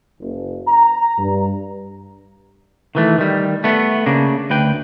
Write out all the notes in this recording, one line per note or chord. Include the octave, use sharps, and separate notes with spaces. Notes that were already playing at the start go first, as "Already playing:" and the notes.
F#1
A#5
G2
D#3 E3 A3
D#3 G3
A3 B3
C#3 A#3 D4
D2 B4 G5